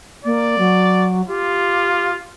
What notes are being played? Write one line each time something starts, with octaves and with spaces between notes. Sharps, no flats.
A#3 D5
F#3
F4 G4